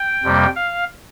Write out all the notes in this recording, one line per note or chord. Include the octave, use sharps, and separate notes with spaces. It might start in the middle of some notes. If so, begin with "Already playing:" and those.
Already playing: G5
F2 C3 G3 A#3
F5